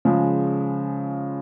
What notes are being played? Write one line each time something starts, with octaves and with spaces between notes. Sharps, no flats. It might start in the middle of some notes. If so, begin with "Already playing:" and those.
C#3 F3 G#3